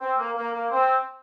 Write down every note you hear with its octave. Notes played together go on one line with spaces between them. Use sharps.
C4
A#3
A#3
A#3
C4